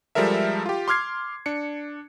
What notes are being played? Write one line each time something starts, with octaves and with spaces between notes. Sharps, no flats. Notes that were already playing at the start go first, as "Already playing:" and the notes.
F3 G3 G#3 A4 A#4 E5
F4 G4
C6 D6 F6 G#6 C7
D4 C#7